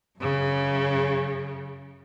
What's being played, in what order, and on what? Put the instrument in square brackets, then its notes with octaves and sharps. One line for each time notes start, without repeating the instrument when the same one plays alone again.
[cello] F#2 C#3